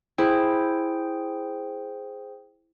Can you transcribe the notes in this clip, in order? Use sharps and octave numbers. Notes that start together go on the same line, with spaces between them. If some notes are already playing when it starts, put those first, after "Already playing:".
E4 G#4 C5 G5